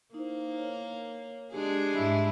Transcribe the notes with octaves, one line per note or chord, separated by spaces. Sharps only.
A#3 D#4 E4 C5
C#5
G#3 D4 G4 G#4
G#2 E4